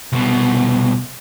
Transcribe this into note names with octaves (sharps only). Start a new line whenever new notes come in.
C2 B2